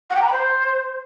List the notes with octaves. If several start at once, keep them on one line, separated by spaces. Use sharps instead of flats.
F#5
G5
A#5
B5
C5